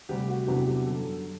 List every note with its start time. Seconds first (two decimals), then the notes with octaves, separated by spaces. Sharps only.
0.09 D2 C3 G3 G4
0.28 F#4
0.47 E2 C3 F#3 B3 D4 G4
0.67 G4
0.86 F#2 D3 G3 A4